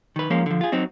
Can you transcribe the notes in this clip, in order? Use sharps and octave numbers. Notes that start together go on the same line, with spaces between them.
D#3 B4
F3 G#3 A#3 C#4
D3 F3
F4 G#4
F#3 C4 D#4